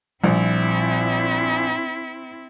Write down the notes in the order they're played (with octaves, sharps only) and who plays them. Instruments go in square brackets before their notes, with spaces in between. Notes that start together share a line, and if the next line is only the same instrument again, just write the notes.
[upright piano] A#1 [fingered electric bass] A#2 G3 [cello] C4 E4